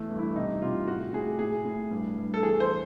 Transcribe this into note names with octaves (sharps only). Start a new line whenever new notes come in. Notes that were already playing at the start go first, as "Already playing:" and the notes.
Already playing: E2 A3
G2
E4
C3 D#4
C3 F4
A2 F#4
A2 G#4
A2 G#4
A2
G2
G2
A4
E2 G#4
C5